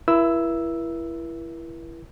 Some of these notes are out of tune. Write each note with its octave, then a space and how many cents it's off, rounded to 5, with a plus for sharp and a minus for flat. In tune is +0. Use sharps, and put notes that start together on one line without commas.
E4 +20 A#4 +45 E6 +0